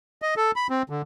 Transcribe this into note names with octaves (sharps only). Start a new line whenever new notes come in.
D#5
A4
B5
C4
D3